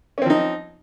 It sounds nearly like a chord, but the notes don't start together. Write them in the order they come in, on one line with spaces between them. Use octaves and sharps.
C#4 C4 F3 D#4